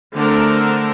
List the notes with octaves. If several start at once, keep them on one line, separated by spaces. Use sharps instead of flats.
D3 A3 C4 D4 A4 A#4